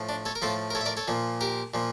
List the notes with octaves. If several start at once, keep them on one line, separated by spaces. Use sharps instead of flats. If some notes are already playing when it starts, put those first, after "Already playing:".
Already playing: A2 F3
D4
A4 C#5
A#4
A2 F3 F4 A4
A#4
A4 C#5
E5
A#4 D5
A4 C#5
A#2 F3
G4 A#4
A#2 F3